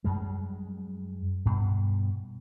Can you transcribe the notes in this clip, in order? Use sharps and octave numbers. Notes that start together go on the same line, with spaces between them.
F#2 G3 G#3
G2 B2